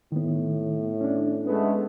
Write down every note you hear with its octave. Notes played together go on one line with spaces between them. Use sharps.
A2 D#3 B3
C#4 D4
G#3 A3 B3